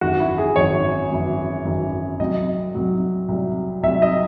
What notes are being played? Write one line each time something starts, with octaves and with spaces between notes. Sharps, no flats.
G#1 F#2 E3 F#4
E4
G#4
G#1 F#2 E3 C#5
G#1 F#2 E3
G#1 F#2 E3
C2 C3 F#3 D#5
C2 C3 F#3
C2 C3 F#3
C2 C3 F#3 E5
D#5